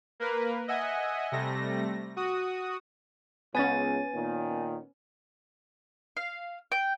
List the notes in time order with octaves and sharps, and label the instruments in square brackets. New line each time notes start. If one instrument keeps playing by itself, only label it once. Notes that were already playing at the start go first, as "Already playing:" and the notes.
[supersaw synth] A#3 A#4 B4
D#5 E5 F#5 G#5
C3 G3 A3 A#6
F#4 D#6
[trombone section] C#2 C#3 [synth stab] B3 C#4 [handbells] G#5 A6
[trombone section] A#2 D#3
[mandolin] F5
G5